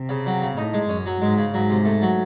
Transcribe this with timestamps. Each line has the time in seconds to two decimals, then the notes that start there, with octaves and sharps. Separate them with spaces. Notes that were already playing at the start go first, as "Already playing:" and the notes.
Already playing: C3
0.09 C#3
0.26 F#3
0.42 C#3
0.57 A2 D#4
0.74 G#3
0.89 F#2 C#4
1.06 F#3
1.21 G#2 G#3
1.38 C#3
1.54 G#2 F#3
1.70 C3
1.85 A3
2.02 F#3